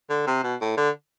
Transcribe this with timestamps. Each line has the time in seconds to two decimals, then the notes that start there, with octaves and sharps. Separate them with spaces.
0.10 D3
0.27 C3
0.43 B2
0.61 A2
0.77 D3